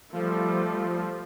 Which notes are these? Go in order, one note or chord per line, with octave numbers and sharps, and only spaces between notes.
F3 G3 A3